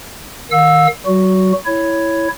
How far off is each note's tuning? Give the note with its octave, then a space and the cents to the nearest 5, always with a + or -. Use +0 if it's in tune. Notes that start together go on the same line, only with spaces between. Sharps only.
D#3 +0 F5 +35 E6 -5
F#3 +35 F#4 +0
E4 +0 C#5 +0